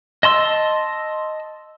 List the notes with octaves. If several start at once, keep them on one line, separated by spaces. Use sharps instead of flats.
D#5 A5 C6 E6